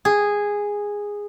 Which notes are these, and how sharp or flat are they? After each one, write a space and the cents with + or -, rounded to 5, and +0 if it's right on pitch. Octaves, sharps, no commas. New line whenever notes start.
G#4 -10